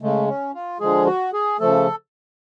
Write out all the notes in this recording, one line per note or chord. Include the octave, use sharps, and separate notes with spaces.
C#3 G#3 A3
C#4
F4
D3 F3 G#3 G#4
F#4
G#4
C#3 F3 A3 A4